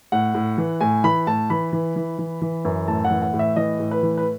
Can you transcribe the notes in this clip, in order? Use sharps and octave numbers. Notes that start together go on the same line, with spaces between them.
A2 F#5
A2
E3
A2 G#5
E3 B5
A2 A5
E3 B5
E3
E3
E3
E3
F#2
A2 A5
F#5
E3
F#5
A2
E5
E3 D#5
A2
B4
E3
B4